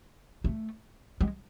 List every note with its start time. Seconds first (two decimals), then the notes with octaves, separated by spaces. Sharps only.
0.44 A3
1.21 G#3